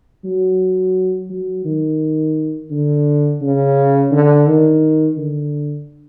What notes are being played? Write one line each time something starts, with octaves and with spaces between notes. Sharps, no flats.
F#3
F#3
D#3
D3
C#3
D3
D#3
D3